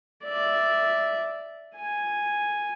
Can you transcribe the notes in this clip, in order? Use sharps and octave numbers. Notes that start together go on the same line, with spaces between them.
D5 E5
G#5